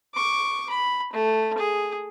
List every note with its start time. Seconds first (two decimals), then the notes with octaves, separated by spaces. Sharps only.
0.14 C#6 D6
0.70 B5
1.12 A3
1.58 G#4